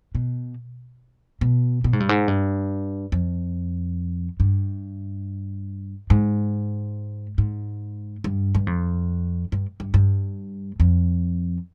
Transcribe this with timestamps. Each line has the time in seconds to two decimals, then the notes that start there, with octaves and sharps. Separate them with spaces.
0.15 B2
1.41 B2
1.84 B2
1.93 G#2
2.00 G2
2.09 G#2
2.28 G2
3.12 F2
4.40 G2
6.10 G#2
7.38 G#2
8.24 G2
8.55 G2
8.67 F2
9.52 G2
9.80 G2
9.94 G2
10.80 F2